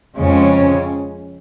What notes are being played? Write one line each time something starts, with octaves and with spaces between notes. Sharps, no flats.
F2 C#3 G#3 C#4